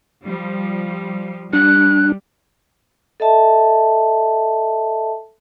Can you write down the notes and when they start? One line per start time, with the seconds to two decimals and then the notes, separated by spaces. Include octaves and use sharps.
0.25 F3 G3
1.53 G3 D4 F#6
3.20 A4 D#5 E5 A5